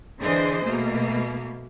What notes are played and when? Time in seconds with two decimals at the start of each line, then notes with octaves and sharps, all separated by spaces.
0.21 D3 E3 D4 G#4 C5 D#5
0.65 B2 A3 A#3